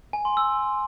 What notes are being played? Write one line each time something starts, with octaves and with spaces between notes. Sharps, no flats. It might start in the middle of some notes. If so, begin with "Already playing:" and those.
G#5
C6
E6